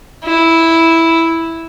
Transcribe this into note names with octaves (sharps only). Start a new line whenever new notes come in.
E4